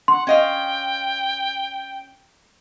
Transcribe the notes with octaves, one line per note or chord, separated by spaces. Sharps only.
F#5 C6
C#4 D#5 F5 G5